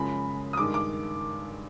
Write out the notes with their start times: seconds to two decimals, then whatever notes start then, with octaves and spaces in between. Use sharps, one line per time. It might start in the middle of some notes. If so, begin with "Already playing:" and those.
Already playing: F#2 C#3 F3 G#3 B5
0.53 D#6
0.57 G2 D#3 G#3 D6
0.74 D6